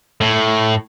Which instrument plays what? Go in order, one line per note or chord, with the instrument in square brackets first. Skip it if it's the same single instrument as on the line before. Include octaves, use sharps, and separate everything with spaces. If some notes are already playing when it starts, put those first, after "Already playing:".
[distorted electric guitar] A2